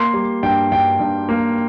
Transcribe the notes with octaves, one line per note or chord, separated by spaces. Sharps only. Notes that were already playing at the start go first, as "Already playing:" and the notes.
Already playing: A#3 C6
G3
G2 G5
G2 G5
G2
A#3